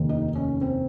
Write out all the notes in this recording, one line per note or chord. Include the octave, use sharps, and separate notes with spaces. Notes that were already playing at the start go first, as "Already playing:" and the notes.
Already playing: F1 D#2 D#3
D#4
C#4
C4